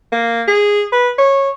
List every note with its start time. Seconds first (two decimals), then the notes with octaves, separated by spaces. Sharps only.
0.12 A#3
0.48 G#4
0.92 B4
1.18 C#5